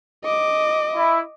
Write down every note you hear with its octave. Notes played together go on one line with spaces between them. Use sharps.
D#5 D6
E4